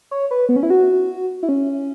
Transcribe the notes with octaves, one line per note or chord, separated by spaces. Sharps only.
C#5
B4
B3
C#4
E4
F#4
E4
C#4